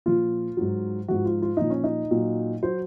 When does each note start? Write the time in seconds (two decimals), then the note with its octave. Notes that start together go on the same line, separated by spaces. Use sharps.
0.06 A#2 F3 F4
0.57 G#2 F#3
1.08 G#2 F3 F#4
1.25 F4
1.42 F4
1.57 A#2 F3 D#4
1.70 C#4
1.84 D#4
2.11 A#2 F#3
2.63 F#3 C5